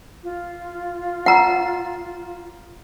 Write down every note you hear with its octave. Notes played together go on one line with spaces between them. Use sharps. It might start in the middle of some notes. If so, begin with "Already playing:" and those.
F4
F#5 A#5